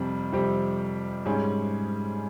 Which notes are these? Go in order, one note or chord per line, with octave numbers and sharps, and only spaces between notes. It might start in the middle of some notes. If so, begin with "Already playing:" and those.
Already playing: F2 C3 G3 C4
F2 C3 G3 C4 G4
G#2 G3 C#4 G#4